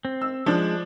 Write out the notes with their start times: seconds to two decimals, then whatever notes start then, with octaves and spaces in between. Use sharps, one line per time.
0.05 C4
0.22 E6
0.46 F3 G#3 D4